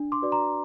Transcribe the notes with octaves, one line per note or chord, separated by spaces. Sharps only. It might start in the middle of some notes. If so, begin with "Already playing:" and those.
Already playing: D4
C6 D6
F#4 B4 D5
A#5 C6